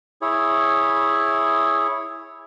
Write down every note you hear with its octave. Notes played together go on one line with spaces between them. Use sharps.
E4 G#4 C#5